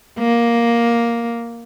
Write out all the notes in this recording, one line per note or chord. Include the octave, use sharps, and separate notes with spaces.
A#3